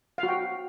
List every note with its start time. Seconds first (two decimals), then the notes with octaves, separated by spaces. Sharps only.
0.18 F5
0.23 F#4
0.28 G5